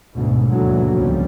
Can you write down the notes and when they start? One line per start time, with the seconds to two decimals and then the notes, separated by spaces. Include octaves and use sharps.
0.14 D2 G#2 B2
0.46 D#2 G#2 B2 D3 E3 F#3
0.93 C#2 A#2 C#3 F3 G3